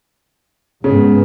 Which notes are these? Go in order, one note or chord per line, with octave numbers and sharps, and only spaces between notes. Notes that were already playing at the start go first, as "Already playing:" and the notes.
G#2 C#3 G#3 B3